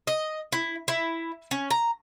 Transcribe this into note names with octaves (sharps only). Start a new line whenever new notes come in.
D#5
E4
E4
C#4
A#5